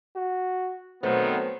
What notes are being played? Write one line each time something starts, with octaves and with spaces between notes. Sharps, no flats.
F#4
B2 D#3 F#3 A3 B3 C4 C5